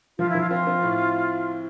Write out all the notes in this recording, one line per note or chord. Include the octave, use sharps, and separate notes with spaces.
F3 F4
E4
F3
F4
C4 F4
C4
A2